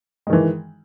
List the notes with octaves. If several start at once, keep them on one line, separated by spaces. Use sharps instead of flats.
D#3 E3 G#3